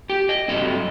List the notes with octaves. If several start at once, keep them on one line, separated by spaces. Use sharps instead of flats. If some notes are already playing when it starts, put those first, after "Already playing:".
G4
D#5
G2 F#3 A3 C4 D#5